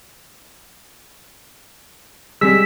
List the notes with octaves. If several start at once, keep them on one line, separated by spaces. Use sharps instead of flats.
G3 G#3 E6 B6